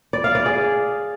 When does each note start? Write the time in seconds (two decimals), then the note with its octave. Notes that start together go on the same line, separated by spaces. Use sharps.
0.13 D5
0.24 F5
0.35 D5
0.46 G#4